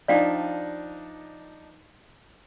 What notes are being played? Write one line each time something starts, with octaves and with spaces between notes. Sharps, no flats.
F3 D4 D#4 D5 F5 G5